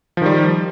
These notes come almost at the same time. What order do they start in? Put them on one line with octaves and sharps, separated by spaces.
F3 D#3 G3